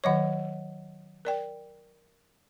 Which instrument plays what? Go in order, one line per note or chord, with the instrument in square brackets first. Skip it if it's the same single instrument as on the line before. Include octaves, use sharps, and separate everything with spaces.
[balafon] D#3 F#3 C#6 [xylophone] C#5 D#5 F#5
[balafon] A#4 D5 G5